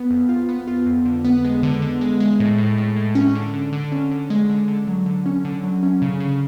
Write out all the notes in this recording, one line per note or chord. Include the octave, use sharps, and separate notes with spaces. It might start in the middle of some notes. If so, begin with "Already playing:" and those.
Already playing: B3
F2
F4
B3
F4
F2
D3
B3
G#3
D3
D3
G#3
G#3
A2
A2
A2
A2
C#4
D3
D3
D3
C#4
D3
G#3
D3
D3
F#3
D3
C#4
D3
F#3
C#4
C#3
C#3